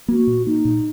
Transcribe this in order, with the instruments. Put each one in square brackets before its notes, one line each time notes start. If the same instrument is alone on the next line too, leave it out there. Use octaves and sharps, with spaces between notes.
[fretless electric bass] A#3 [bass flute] F#4
[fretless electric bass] A#2
[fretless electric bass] A#3 [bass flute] D#4
[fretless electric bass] A#2